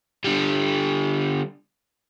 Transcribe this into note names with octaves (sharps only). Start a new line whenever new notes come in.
D3 G3